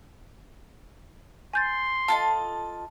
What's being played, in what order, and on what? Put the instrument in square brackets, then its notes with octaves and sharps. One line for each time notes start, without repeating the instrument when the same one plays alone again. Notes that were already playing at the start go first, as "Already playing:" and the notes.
[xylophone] G#5 G6 A6 [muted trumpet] C6
[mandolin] F4 A4 D#5 [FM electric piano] A5